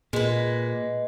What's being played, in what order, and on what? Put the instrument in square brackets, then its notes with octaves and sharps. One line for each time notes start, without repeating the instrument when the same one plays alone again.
[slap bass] A#2 [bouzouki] G#3 B4